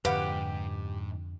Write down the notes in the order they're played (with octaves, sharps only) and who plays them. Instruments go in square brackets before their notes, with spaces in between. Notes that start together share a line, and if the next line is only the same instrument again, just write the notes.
[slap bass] F2 D3 [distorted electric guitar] G#2 [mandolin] G4 [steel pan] B4 F5 F#5